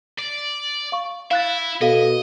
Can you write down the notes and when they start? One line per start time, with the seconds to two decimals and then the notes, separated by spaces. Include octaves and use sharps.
0.18 D5
0.92 F5 C#6
1.31 E4 F5 F#6 A6
1.81 B2 A4 D#5 F5